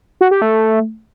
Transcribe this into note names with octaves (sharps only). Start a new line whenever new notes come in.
F#4
G4
A3